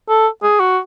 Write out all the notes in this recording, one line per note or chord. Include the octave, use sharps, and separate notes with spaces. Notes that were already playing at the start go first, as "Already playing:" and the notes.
A4
G#4
F#4